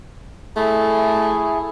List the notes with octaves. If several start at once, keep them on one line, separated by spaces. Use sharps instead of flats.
A3 E4 G#4